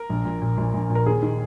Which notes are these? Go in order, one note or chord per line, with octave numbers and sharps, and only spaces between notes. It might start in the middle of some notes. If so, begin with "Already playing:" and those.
Already playing: A#4
A#1
A#2
A#2
A#1
A#1
A#2
A#4
D#2 G#4
D#3